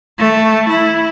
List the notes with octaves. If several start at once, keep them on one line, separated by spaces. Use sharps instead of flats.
A3
E4